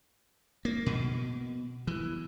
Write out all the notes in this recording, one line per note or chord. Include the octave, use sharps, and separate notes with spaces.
A#3
B2
E3